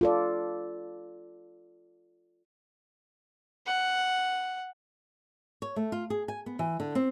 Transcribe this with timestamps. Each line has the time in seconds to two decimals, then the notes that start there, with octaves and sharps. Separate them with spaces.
0.01 F4 A4 D5
3.67 F#5
5.62 C#5
5.76 A3
5.92 F4
6.10 G#4
6.28 G#5
6.46 B3
6.59 E3
6.80 D3
6.95 C4